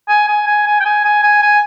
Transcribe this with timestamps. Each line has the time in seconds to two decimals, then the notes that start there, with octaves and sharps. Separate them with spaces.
0.08 G#5
0.28 G#5
0.47 G#5
0.66 G#5
0.80 G5
0.85 G#5
1.05 G#5
1.23 G#5
1.42 G#5